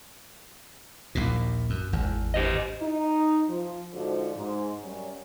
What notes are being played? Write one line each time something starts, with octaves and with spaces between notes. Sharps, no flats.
A#1 D#2 A#2
F#2
G#1 E2
G4 C5 D#5
D#4
F3
G#2 D3 F3 D4 F#4 C5
G#2
F#2 F#3 G3 C#4